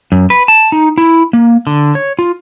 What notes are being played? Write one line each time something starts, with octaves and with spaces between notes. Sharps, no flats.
F#2
B4
A5
D#4
E4
A#3
D3
C#5
F4